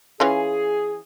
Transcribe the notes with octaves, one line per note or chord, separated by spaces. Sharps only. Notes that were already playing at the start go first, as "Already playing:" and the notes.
E3 C#4 F4 G#4